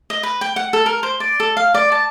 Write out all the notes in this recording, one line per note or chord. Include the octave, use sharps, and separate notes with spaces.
D#5
B4
G5
F#5
A4
A#4
C5
D5
A4
F5
D5
A5